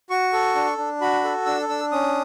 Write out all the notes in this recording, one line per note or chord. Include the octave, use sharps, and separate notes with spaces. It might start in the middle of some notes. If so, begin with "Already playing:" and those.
F#4 C#6
A4
D4
D4
F#4 B5
A4
D4 E6
D4 E6
C#4 D#6